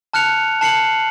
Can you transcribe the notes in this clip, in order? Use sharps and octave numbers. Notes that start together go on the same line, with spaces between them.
A5 F6 F#6 C#7 F7
A5 C7 C#7 F#7